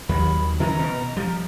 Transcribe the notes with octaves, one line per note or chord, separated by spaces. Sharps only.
D#2 D#3 F#3 B5
D#3 E3 C#4 A#5
B2
F3 G3